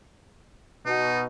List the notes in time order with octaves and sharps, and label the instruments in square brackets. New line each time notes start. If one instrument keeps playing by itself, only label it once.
[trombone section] B2 [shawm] D#4